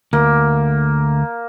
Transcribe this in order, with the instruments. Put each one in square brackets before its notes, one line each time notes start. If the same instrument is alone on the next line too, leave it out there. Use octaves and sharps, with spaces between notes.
[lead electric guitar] D2 [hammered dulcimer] A#3